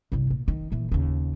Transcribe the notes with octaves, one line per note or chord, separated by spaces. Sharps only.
G1 C2
A#2
D#3
A#2 E3
D#2 C#3